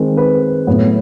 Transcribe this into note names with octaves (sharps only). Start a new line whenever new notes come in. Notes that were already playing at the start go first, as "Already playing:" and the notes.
Already playing: D#3 G#3 C4
B4
A2 F#3 B3